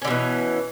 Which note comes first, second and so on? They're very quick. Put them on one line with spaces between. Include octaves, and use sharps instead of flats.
C#4 D3 B2 E3